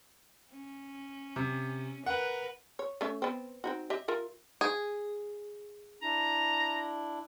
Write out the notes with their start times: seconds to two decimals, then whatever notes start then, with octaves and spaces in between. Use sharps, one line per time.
0.52 C#4
1.36 C3
2.06 A#4 B4 F#5
2.79 C#5
3.01 A3 C#4 E5
3.22 B3 C4
3.64 C4 D#4 F#4
3.90 G4 D#5 E5
4.08 F4 A#4 E5
4.61 G#4
6.02 D4 E4 A#5